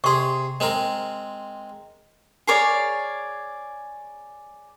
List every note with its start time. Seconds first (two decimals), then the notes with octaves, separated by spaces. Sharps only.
0.04 C3 G#4 C6 C#6
0.60 G#3 C4 A#4
2.47 G#4 A#4 C#5 D5